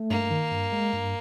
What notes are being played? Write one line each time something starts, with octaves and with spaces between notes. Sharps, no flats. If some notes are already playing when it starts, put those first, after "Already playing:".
Already playing: A3
G2 A#3
D#3
G2
G#3
G2